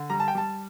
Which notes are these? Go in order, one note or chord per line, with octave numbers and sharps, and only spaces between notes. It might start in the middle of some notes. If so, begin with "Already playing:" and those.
Already playing: D3
G3 A#5
A5
G5
G3 A5